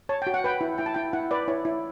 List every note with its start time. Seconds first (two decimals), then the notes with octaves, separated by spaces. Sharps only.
0.09 C#5 A5
0.22 F#4 G5
0.34 F#5
0.44 B4 G5
0.61 E4
0.78 E4 G5
0.86 A5
0.94 E4 G5
1.13 E4 F#5
1.31 B4 D5
1.48 E4 C#5
1.65 E4